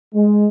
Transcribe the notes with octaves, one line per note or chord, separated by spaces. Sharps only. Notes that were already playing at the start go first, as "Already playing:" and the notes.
G#3